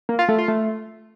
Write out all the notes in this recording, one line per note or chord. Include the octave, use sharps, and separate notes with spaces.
A#3
F4
A3
F4
A3